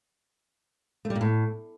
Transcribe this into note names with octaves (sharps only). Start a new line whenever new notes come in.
A3
G3
A#2
A2